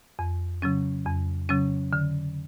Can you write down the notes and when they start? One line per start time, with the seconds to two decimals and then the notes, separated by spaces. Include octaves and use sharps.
0.19 F2
0.62 C#3 F#3 C#4
1.05 F2
1.49 C#3 F#3 C#4
1.93 D3